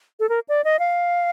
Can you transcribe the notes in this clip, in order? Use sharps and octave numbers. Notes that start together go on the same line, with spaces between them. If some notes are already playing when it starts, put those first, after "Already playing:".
A4
A#4
D5
D#5
F5